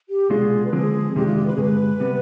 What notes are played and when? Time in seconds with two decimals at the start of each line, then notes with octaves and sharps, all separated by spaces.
0.09 G4
0.30 C2 B2 G#3 D4 F4 G#4
0.65 B4
0.73 D3 F3 G#3 C4 G#4
1.15 F2 C3 D#3 G#3 D4 G4
1.25 F4
1.36 G4
1.47 B4
1.54 G#4
1.57 G2 D3 G#3 B4
2.00 C3 G3 B3